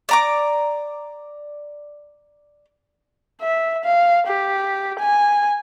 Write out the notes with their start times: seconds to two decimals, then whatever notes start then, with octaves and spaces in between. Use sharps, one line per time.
0.09 D5 A#5 D6
3.41 E5
3.84 F5
4.27 G4
4.99 G#5